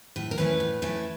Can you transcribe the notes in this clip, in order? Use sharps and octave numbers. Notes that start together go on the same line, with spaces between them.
A2 B4
A#4
E3 A3 C#4 E4 B4
A2
E3 A3 C#4 E4